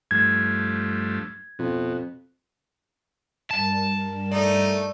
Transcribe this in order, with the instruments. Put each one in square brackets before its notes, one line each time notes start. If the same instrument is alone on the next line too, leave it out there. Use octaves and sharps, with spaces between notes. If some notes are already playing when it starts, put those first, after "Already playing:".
[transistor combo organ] G2 F3 A3 [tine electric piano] G#6
[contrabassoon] F2 [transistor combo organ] B2
[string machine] G2 G3 A#4 [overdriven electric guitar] A5
[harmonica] A3 D#4 [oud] D5